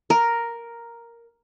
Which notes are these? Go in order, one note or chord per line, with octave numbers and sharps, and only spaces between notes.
A#4